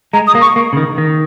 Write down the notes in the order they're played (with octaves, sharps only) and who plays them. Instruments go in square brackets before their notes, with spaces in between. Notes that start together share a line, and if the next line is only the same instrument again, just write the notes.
[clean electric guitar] G#3 [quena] A#5
[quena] D#6
[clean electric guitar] A#3
[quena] C#6
[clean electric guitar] A#3
C#3
D#3
D#3